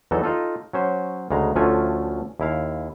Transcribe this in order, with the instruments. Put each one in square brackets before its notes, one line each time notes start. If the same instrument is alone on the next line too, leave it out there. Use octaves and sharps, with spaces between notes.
[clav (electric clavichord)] E2 E3 F#3 D#4 A4
D#4 F4 A4
F#3 C#4 C5
D2 C#3 G#3 A#5
D2 F3 A3 C#4 F4 G#5
D#2 E4 F5